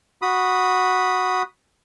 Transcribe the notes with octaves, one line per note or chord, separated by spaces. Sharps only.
F#4 B5 D#6